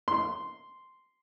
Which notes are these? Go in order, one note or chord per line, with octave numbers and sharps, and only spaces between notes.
C6